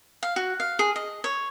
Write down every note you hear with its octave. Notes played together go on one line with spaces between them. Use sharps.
F5
F#4
F5
G#4
D#5
C#5